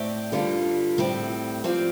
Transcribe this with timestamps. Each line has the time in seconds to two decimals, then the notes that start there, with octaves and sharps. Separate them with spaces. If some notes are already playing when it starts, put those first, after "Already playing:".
Already playing: A2 A3 C4 G4 D5
0.32 G2 D3 G3 F4
0.98 A2 G3 C4
1.64 F3 C4 G4 D5